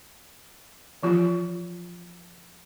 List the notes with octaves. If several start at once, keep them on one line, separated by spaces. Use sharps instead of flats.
E3 F3 F4